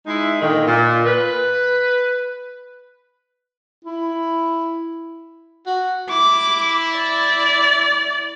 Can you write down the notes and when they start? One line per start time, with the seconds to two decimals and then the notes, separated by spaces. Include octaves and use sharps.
0.06 G#3 D#4 E4
0.40 A#2 D3 D#3
0.67 A#2
1.05 B4
3.84 E4
5.66 F#4
6.10 E4 D6
6.96 D5